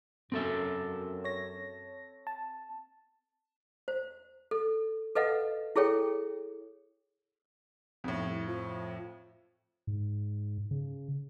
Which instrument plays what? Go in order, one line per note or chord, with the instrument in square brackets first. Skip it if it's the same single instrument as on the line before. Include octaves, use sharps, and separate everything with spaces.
[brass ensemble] F#2 [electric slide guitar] C4 A4 E5
[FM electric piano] C#5 A#6
A5
[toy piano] C5
A4
A4 B4 D#5 F5 F#5
E4 G#4 A4 C#5 G5
[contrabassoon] B1 [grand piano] F2 A2
[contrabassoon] C2
F3
[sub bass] G#2
C#3